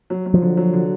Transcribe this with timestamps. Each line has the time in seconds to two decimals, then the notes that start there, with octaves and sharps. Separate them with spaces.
0.10 F#3
0.26 F#3
0.34 F3
0.42 D3
0.57 F#3
0.73 D3